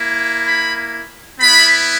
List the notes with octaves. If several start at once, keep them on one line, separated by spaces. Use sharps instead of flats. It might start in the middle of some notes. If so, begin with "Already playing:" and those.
Already playing: A#3 E4
B5
B3 E4 B5